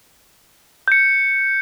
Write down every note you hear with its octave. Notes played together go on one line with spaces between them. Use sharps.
G6 C#7